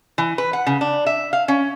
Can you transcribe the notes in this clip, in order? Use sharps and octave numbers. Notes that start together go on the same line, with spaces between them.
E3
B4
F#5
C#3
D4
E5
F5
C#4